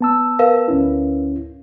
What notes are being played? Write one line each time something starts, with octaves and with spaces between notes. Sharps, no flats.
B3 A5 E6
A#4 B4 F5
D2 C#4 E4